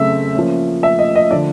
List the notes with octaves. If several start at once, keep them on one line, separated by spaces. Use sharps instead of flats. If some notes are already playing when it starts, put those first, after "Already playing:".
Already playing: C#3 F#3 A3 C4 E5
F3 A#3 C#4
E5
D#5
D#5
D3 F3 A3 D4 D5